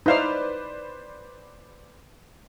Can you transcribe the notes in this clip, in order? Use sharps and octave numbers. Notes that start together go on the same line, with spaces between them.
D#4 E4 B4 C5 D5 F5